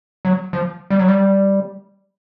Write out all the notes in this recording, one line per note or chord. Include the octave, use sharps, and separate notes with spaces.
F#3
F3
G3
F#3
G3